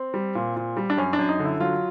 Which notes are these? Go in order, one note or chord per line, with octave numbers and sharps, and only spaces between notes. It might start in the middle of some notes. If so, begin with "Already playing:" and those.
Already playing: C4
G3
A#2
A#2
G3
D4
F#2 C#4
D4
F#2
D#4
D3
E4
F#3 F4